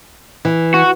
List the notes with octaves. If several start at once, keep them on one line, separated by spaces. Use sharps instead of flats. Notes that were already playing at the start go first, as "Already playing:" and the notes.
E3
F#4